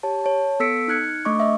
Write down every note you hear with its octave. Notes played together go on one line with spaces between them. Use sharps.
G4 C#5 A5
C#5 A5
B3 A4 E6 B6 C#7 D7
D#4 F6 F#6 G#6 C#7
A3 D4 D#5 C#6 D6
D#5 E5